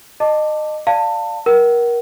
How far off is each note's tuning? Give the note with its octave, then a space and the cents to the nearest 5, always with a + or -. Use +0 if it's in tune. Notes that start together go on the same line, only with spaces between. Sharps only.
D#5 -25 A5 +15 D6 +5
D5 +0 F5 +0 A5 +25
A#4 +25 F#5 +40